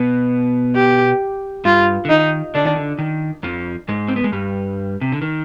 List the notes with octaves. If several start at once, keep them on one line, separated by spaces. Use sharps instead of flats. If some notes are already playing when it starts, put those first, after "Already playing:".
Already playing: B2 B3
G4
G2 G3 F4
D3
D#3 D#4
D3 D4
D#3
D3
D#3
F2 F3
G#2 G#3
C4
B3
G#3
G2 G3
C3
D3
D#3